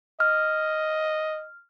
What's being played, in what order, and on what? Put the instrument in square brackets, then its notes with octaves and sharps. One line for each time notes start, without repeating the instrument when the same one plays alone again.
[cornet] D#5 [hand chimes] F6